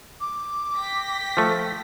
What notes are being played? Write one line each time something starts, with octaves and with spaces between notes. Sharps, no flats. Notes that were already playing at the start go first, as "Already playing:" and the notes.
D6
G5 A#6 B6
F3 A3